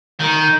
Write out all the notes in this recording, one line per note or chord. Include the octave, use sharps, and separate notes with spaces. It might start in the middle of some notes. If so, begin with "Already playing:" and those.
D#3